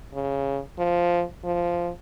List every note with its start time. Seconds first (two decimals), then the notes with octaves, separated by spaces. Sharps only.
0.14 C#3
0.78 F3
1.44 F3